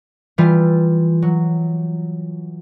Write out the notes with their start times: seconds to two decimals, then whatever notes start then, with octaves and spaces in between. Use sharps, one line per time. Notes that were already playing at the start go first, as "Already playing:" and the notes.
0.38 E3 G3 F4
1.22 F#3